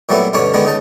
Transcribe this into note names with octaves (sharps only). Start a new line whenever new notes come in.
A#2 F#3 G3 A3 B3 E4
G2 B2 D3 C#4 D4 C#5
D3 D#3 G#3 B3 D4
C#3 D#4 A5